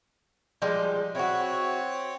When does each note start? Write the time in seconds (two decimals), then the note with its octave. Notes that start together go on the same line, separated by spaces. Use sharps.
0.62 F3 G3 G#3
1.15 C4 E4 F#4 C#5